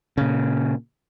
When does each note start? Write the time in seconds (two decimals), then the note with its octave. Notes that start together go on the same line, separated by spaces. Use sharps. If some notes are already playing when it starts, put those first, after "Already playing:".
0.17 A#2 C#3